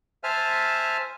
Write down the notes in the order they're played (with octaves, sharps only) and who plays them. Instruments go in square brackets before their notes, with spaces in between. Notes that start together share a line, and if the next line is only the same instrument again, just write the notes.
[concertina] C5 E5 G#5 A5 F6